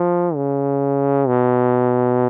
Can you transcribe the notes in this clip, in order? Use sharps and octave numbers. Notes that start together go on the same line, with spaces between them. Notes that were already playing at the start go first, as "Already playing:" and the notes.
Already playing: F3
C#3
B2